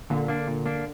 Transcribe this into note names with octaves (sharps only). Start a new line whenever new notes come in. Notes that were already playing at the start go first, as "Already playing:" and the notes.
A#2 D3
A#3 D4
A#2
A#3 D4